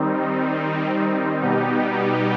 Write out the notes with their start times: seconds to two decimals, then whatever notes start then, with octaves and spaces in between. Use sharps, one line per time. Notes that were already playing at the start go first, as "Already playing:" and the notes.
Already playing: D#3 G3 C4 D#4
1.41 B2 G3 B3 D#4 G4